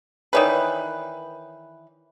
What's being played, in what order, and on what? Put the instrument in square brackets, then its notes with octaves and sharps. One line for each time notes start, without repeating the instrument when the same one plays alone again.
[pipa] D#3 E3 B4 [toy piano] A#4 C#5 D5